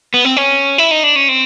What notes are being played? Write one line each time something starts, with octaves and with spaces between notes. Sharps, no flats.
B3
C4
C#4
E4
D#4
D4
C#4
C4